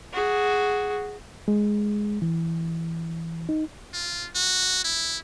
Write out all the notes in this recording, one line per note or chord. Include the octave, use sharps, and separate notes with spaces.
F#4 G#4
G#3
E3
D#4
F4
F#4
E4